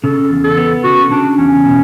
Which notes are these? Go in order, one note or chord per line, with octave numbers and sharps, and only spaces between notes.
C#3 A4
E2
A4
B3
C#3 F#4
C#3 D4
E2 C#4
B2